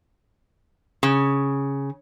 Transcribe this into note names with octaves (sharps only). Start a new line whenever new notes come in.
C#3